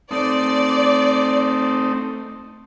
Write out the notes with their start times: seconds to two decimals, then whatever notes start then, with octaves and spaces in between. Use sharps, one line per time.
0.11 A3 C4 D#4 D5